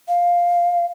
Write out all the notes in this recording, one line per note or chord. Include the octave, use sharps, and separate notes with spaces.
F5